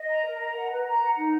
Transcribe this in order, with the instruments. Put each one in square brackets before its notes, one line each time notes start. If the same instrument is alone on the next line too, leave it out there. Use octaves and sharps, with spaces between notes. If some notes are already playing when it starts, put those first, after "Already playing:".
Already playing: [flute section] D#5
A#5
A#4
A#5
F#5
B4
A#5
F#5
D#4